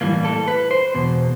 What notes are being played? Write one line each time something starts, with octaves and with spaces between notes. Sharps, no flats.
A2 E3 G3 A#3
A4
B4
C5
E2 B2